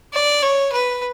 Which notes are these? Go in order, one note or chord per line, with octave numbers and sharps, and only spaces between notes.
D5
C#5
B4